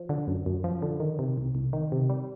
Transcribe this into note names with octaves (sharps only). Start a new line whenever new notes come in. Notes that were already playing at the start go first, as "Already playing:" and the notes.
Already playing: F3
D3
F#2
F#2
F3
D3
D#3
C3
C2
C2
D#3
C3
G3